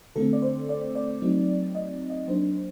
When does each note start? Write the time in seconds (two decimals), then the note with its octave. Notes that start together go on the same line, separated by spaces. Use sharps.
0.16 D3 A3 C4 A4
0.33 D5
0.42 C5
0.69 D5
0.95 D5
1.22 F#3 A3 C4 D#4
1.75 D#5
2.10 D#5
2.28 F#3 A#3 D4 C5